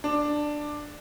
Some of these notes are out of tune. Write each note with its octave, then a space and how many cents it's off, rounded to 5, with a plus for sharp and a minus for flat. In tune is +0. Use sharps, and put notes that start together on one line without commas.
D4 +10